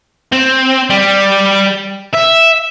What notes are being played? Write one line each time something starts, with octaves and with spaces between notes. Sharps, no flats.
C4
G3
E5